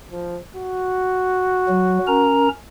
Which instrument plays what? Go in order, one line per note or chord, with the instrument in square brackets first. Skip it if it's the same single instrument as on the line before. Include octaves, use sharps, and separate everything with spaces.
[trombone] F3
F#4
[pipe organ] F#3
C#4 A#4 A#5